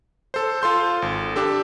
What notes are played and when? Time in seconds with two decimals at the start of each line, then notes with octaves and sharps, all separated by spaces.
0.34 A4 C5
0.62 F4 A4 C6 G6
1.02 G#1
1.36 D4 G4 A4